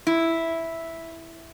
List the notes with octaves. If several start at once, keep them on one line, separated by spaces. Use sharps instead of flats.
E4